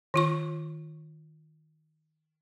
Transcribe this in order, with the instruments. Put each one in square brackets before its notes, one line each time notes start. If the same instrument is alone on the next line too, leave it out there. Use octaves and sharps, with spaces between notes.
[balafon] D#3 F4 C#6